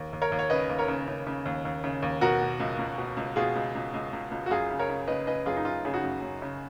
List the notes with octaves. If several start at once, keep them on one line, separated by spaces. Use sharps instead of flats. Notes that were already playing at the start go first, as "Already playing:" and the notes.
Already playing: D#2
D#2
A#4 C#5
D#2
C#5
C#3 B4 D#5
D#2
A#4 C#5
C#3
C#3
C#3
D#2
D#2
C#3
D#2
B2 F#4 A#4
B2
C#2
C#2
B2
C#2
B2 F4 G#4
C#2
C#2
C#2
C#2
C#2
F#4
F#2 F4 G#4
C#3
A#4 C#5
C#3
C#3 B4 D#5
C#3 B4 D#5
F#2 F4 G#4
D#4
F#2 F4
C#3 G#4
D#4 F#4
F#2
F#2
C#3